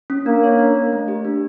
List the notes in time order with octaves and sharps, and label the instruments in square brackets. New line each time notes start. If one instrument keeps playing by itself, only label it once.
[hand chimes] C#4
[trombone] A#3 [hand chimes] D4
[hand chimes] C#5
D4
D4
A3
G4
D4